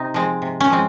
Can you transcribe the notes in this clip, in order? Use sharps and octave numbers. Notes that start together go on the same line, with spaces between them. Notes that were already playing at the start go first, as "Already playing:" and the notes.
Already playing: C3 D#4
F3 G#3 C4
C3
C#4
F3 G#3 C4